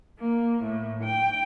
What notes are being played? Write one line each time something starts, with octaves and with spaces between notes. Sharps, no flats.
A#3
A2
G5